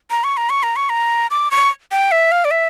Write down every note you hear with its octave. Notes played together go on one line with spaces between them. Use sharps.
A#5
C#6
A#5
C#6
A#5
C#6
A#5
D6
C#6
G5
E5
F5
D5
E5